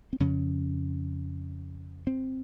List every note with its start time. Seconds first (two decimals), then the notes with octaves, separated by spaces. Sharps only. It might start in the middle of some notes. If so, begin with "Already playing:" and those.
0.13 C4
0.20 F2 C#3 C#4
2.07 C4